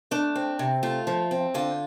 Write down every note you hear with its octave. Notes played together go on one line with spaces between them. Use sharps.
A3 D4
C4
C3
A3 F4
F3
C4
D3 F4